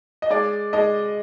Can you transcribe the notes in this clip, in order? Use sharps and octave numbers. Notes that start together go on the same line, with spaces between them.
D#5
G#3 D5
G#3 D#5